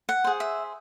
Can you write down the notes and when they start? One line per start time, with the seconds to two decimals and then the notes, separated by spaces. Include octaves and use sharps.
0.09 F#5
0.24 G#4 C5
0.40 E5